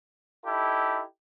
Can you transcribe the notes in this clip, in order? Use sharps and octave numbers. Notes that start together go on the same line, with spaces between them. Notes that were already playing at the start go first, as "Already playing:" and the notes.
D#4 E4 G4 A4